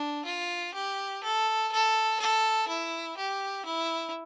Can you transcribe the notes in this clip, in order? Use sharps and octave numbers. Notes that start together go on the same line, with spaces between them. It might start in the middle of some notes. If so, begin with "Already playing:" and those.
Already playing: D4
F4
G4
A4
A4
A4
E4
G4
E4